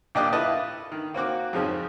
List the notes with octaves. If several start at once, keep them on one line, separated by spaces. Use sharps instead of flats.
A#1 A#3 G4 D5 D#5 F#6
E4 F4 A4 B4 D#5 A5
D#3
A#3 C4 F#4 D6
F2 G#2 C#3 F3